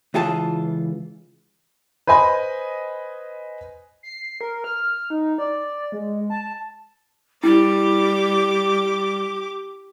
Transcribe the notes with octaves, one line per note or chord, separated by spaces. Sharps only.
C#2 E3 F4 G#4 A5
B4 C5 D#5 G#5 B5
C7
A#4
F6
D#4
D5
G#3
A5
G3 E4 G4 D6